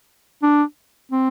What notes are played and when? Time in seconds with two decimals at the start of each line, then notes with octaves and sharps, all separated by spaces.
0.42 D4
1.11 C4